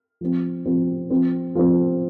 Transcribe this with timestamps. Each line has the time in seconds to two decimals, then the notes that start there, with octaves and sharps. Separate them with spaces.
0.21 F3 C4
0.66 F3 C4
1.10 F3 C4
1.55 F3 C4